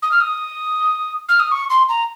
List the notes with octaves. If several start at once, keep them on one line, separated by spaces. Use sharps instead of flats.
D#6
F6
D#6
F6
D#6
C#6
C6
A#5